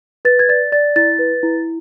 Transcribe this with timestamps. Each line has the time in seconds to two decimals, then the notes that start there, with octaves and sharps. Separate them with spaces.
0.25 B4 A6
0.39 G#6
0.49 D5 A6
0.72 D5 A6
0.96 E4 A6
1.19 B4
1.43 E4